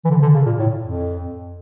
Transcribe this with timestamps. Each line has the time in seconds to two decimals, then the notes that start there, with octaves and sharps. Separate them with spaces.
0.05 E3
0.10 D3
0.22 D3
0.34 C#3
0.46 A#2
0.59 A2
0.82 F2